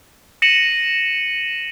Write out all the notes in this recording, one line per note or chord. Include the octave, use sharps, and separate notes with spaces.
A#6 C#7 D#7 E7 F#7